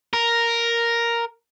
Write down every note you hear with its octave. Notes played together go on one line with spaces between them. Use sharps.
A#4